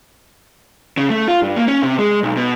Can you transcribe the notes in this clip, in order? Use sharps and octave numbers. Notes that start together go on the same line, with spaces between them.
C#3
A3
F4
G2
A#3
C#4
C3
G#3
B1
B2